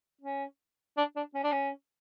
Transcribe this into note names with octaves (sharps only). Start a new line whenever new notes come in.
C#4
D4
D4
C#4
D4
C#4